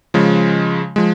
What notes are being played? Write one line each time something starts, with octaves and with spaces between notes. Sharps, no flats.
C#3 F3 G#3
F3 G#3